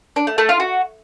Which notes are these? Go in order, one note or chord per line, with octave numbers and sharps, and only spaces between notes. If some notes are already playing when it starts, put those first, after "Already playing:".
D4
A3
A3
F4
F#4